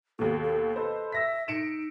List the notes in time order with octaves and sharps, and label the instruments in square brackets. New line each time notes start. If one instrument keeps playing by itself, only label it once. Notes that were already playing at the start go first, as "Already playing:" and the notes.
[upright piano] D#2 B2 [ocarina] A4
[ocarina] A4
[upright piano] A4 B4 C5 [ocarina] D#5
[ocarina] E5 [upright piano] E6 A#6 B6
[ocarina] D#4 [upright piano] C#7 D7 E7